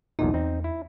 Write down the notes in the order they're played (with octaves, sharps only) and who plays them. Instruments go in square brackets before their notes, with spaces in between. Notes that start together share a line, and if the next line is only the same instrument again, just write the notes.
[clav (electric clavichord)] B1 E2 A#2 [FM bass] D#4
[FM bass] E2 [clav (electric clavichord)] C4 D#4
[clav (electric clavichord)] E4